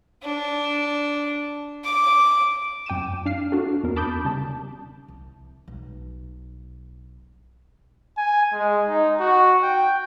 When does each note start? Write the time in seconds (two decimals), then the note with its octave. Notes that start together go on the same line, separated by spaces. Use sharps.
0.23 D4
1.84 D6
2.86 F#2 G5 D6 D#7 E7
3.26 D4 F5 C7
3.52 D4 F#4 A4
3.83 E2 B3 A#4
3.96 A5 B5 D6 D#6 G6
4.25 C#3 G3 A5
5.08 C2
5.68 B1
8.18 G#5
8.53 G#3
8.88 D#4
9.20 F#4
9.63 G5